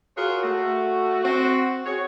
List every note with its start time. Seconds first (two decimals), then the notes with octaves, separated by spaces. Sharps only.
0.16 F4 F#4 G#4 A#4 C#5 F#5
0.43 A3 F#4
1.23 C4 F#4
1.84 C4 F#4 G#4 C#5